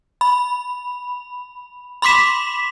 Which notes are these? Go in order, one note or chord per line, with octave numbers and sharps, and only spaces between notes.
B5
B5 C6 D6 B6 E7